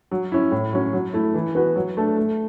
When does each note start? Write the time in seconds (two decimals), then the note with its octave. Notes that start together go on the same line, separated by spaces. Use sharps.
0.11 F#3
0.32 C#4 E4
0.52 A2
0.73 F#3 C#4
0.93 F#3
1.14 A3 E4
1.34 E3
1.55 B3 F#4 B4
1.76 F#3
1.97 A3 D4 A4
2.17 A3